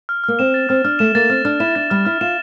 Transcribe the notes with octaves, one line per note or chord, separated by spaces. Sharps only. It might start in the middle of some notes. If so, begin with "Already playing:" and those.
F6
A#3 F6
C4 E7
A6
C4 F6
D4 F6
A3 E7
A#3 A6
C4 F6
D4 F6
E4 E7
D4 A6
G3 F6
E4 F6
F4 E7